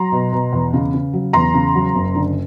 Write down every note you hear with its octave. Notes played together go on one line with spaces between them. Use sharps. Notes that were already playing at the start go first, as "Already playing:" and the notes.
Already playing: F#3 A#5 C6
B2
B2
E2
C#3
C#3
F#3
E2 A#5 C6
C#3
F#3
F#1
D3